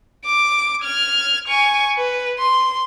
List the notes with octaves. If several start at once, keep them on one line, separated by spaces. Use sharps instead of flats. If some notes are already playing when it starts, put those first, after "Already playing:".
D6
F6 G#6
G#5 C#6
B4
C6